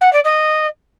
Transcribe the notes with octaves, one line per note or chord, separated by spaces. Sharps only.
F#5
D5
D#5